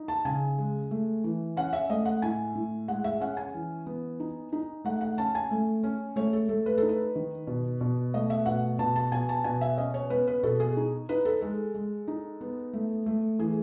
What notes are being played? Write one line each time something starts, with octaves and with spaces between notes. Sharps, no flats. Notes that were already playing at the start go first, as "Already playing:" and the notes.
Already playing: D#4
A5
C#3 G#5
G#3
A3
E3
C#4 F#5
E5
A3 D#5
F#5
A2 G#5
A2
G#3 F#5
E5
C#4 F#5
G#5
E3
B3
D#4
D#4
A3 F#5
F#5
C#4 A5
G#5
A3
C#4
A3 C#5
A4
A3 A4
B4
D#4 A4
B4
D#3
B2
B2
A3 D#5
E5
B2 F#5
B2 A5
A5
B2 G#5
A5
B2 G#5
E5
C#4 D#5
C#5
B3 B4
B4
B2 A4
G#4
D#4
D#4 B4
A4
G#3 A4
G#3
D#4
B3
A3
A3
E3 G#4